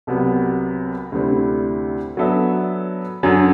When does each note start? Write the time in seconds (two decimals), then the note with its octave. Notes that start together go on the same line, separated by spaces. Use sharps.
0.07 C2 C3 F#3 B3
1.12 D2 C3 G3 C4 E4
2.17 F#3 B3 D4 A4 E5
3.23 F#2 D3 F#3